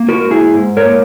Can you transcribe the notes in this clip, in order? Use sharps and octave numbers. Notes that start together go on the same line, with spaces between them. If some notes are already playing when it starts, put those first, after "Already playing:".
Already playing: A#3
F#4 A#4
G#2
E4 G#4
G#2
A#4 C#5
A#3